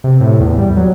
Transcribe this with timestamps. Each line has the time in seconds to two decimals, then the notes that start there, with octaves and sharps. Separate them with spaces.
0.04 C3
0.21 A2
0.40 E2
0.58 G3
0.77 F#3